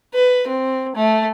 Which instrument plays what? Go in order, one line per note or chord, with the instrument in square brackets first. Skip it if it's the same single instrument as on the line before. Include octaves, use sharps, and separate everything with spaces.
[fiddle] B4
C4
A3